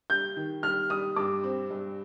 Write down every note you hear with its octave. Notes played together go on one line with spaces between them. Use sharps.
G3 G6
D#3
G3 F6
G3 D#6
G2 D6
C4
G2